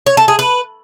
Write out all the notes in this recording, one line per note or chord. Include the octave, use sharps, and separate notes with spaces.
C#5
A4
G#4
B4